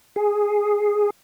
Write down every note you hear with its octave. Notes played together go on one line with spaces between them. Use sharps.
G#4